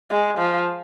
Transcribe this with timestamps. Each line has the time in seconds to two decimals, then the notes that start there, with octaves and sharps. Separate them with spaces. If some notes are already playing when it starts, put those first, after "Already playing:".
0.10 G#3
0.38 F3